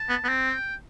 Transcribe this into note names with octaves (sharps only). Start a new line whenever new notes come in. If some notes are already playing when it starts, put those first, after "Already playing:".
Already playing: A5
B3
B3
C4
G5